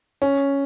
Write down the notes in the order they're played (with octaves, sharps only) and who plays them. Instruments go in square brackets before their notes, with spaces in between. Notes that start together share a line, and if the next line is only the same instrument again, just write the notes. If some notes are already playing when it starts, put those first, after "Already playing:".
[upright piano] C#4